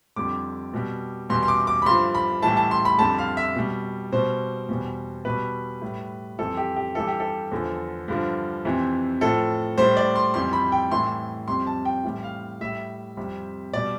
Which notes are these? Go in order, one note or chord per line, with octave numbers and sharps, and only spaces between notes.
F2 D3 G3 D6
B2 G3
E2 B2 G3 C6
C6
D6
D6
B5
G2 D3 F3 C6
B5
A2 E3 G3 A5
A5
C6
B5
F2 D3 G3 A5
F5
E5
B2 G3
B2 G3 C5
E2 B2 G3
B2 G3 B4
A2 G3
F2 E3 G3 A4
G4
G4
G2 E3 G3 A4
G4
A4
E2 D3 F3
G2 D3 F3
F2 C3 E3
A2 F3 A4
A2 G3 C5
D5
C6
F2 E3 G3 C6
B5
G5
A2 E3 G3 C6
F2 C3 G3 C6
A5
G5
A2 E3 G3
F5
A2 G3 E5
F2 C3 G3
B2 G3 D5